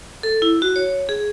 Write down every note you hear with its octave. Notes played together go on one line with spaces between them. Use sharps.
A4
E4
F#4
C#5
G#4